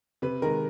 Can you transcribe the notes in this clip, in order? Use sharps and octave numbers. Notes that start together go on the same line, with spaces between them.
C3 B4
D#3 G#3 A#4